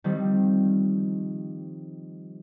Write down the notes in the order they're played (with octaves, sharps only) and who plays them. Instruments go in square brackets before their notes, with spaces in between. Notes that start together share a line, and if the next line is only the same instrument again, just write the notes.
[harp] D#3 F3 G3 C4